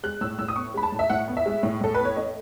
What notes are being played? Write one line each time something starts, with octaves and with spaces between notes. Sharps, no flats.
G#3 F#6
A2 E6
A2 E6
D#6
B3 C#6
G#3 B5
A5
A2
E5
A2 F#5
B3
E5
G#3
A2
A2 A4
B3 B4
C#5
A3 D#5